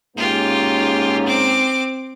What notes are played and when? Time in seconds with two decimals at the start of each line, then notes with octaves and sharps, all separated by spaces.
0.17 G#2 A#3 C#4 F4 G4
1.25 C4 D6